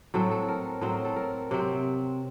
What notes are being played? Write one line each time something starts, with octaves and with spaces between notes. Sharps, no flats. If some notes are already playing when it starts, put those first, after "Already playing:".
A2 F#3 C4 A4
A4
A#4
A2 F#3 C4 C5
A#4
A4
A#4
C3 F#3 C4